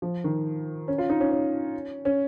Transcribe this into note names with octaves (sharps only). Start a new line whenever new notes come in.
F3
D#3
C#4
F4
D#4
C#4
C#4
C#4